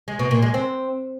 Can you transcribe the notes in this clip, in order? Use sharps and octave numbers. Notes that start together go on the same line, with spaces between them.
G#3
B2
A#2
G#3
C4